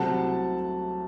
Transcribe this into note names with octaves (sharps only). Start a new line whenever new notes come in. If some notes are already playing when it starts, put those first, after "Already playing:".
Already playing: C2 C3 F#3 A3 F#5 A5